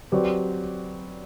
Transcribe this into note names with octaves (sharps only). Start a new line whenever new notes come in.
F#3 C4 G4 B4 D5